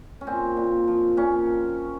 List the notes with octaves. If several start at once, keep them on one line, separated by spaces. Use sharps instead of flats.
C#4
A#2 C4
A#2
F3
A#2 C#4